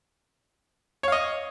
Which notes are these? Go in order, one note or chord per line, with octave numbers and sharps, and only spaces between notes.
C#5 D#5 F5